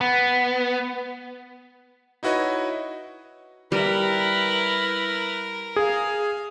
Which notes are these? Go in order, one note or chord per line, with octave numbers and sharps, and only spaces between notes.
B3
D#4 E4 F#4 B4 C#5 D#5
G3 E4 A#4 B4
G#4 F5